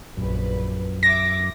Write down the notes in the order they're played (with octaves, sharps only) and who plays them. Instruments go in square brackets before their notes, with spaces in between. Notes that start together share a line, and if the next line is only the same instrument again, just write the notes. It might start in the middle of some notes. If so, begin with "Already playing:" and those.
[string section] A#1 B4 [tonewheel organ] F#2
[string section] E5 D6 [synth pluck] A#6